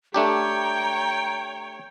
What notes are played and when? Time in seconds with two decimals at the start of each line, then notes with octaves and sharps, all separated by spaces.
0.14 A3 D4 G4 C#5 G5 A#5